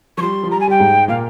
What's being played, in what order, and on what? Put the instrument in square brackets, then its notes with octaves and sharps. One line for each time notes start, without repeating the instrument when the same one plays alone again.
[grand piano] F3 [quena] C#6
[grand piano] G3 [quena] C6
[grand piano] F3
[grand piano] G3 [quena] A#5
[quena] G#5
[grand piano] G3 [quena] G5
[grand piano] G#2 G#3
[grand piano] A#2 A#3 [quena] F5